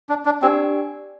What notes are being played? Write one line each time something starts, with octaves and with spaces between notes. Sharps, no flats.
D4
D4
C4 D4 G4 D5 G#5